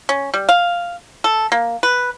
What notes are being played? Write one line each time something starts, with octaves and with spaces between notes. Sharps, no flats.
C#4
G3
F5
A4
A#3
B4